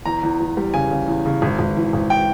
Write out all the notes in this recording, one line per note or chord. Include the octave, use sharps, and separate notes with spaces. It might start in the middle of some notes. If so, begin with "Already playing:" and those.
E2 A#5
E2
E2
G3
C#3 G#5
C#3
E2
C#3
G#1
G#1
E3
G#1
G5